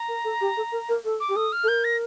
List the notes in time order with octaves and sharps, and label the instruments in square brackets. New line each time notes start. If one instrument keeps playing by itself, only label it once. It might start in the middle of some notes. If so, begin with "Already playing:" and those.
Already playing: [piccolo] A#5
[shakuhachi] A#4
A4
G4
A4
A#4
A#4
A4
[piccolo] D6
[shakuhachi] G4
[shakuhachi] A4 [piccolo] D#6
[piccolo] F6
[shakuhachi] A4
[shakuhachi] A#4 [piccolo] G6
[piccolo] A#6